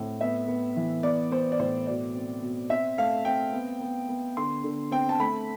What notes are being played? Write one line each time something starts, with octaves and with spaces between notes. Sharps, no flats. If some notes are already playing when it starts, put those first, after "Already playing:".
Already playing: A2 C4
B3 E5
B3
E3
B3 D5
B3 C5
D5
A2 C5
B2 D5
C4
B2
C4 E5
A3 F5
C4 G5
B3
B3
B3
D3 C6
D3
C4 G5
A5
A3 B5